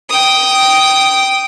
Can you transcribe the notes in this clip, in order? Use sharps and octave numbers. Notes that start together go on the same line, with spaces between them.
G5 D#6